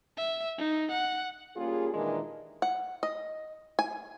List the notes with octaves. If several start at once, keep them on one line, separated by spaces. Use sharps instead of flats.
E5
D#4
F#5
G3 A#3 C#4 F4 G#4
A#2 D#3 E3 G#3 D4 A#4
F#5
D#5
G#5